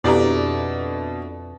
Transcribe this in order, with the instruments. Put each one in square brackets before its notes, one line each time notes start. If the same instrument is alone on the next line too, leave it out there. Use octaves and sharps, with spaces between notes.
[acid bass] F2 [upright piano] B2 [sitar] A3 D4 D5 [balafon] E4 G4 A#5